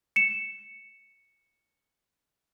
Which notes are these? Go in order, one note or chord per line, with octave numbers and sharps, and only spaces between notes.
C#7 E7